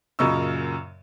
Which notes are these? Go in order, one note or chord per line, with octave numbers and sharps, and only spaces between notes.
F#2 A#2 C#3 D#5 C#6 E6